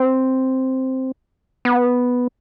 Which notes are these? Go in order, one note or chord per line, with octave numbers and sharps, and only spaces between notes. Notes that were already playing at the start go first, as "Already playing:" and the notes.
Already playing: C4
B3